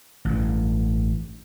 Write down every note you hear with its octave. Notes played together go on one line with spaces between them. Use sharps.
A1 G2